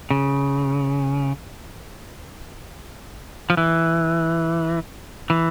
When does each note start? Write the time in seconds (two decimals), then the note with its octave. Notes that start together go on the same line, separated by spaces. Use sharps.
0.10 C#3
3.50 F3
3.57 E3
5.30 E3